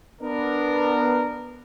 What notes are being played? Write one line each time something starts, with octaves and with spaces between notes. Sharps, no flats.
B3 D4 A#4